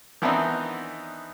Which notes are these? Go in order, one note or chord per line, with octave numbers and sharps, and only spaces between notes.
D#3 E3 B3 C4 D4 D#4